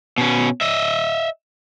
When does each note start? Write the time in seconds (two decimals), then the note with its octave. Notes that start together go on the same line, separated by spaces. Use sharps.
0.18 B2 C#4
0.61 D#5 E5